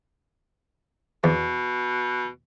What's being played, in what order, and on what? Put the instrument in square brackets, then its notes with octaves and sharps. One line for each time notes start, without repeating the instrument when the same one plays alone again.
[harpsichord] E2 [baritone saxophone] B2